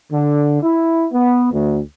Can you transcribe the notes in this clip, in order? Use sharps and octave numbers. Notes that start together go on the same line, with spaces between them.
D3
E4
B3
D2